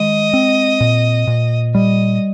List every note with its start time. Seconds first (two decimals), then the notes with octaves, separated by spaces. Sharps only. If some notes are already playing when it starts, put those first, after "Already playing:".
Already playing: D#3 G#3 D#5
0.33 C4
0.80 A#2
1.27 A#2
1.75 G3 D#5